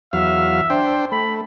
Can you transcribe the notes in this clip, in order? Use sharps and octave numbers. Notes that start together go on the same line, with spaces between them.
E2 F#3 E5 F5
D4 C5 G5
A3 B5